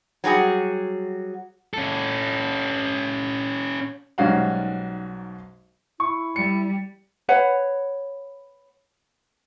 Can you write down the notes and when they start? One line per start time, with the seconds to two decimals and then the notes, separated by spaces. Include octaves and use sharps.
0.24 F#3 G3 F#4 G#4
1.74 C#4 A4
4.18 B1 G#2 G3 C#4 F#4 F5
6.00 E4 C#6
6.36 G3 C#7
7.29 B4 C#5 F#5